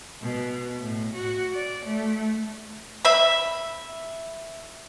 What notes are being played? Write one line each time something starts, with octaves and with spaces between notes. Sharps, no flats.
B2
A2
F#4
D5
A3
E5 B5